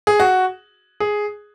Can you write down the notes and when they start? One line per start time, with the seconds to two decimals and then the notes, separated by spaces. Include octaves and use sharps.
0.07 G#4
0.20 F#4
1.00 G#4